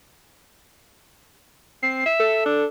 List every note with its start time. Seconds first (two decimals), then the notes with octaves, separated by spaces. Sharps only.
1.83 C4 C7
2.06 E5
2.20 A4
2.46 D4